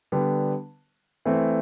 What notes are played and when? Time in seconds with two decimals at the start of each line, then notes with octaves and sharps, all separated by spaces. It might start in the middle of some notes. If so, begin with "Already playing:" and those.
0.12 D3 G3 B3
1.25 E3 A3 C4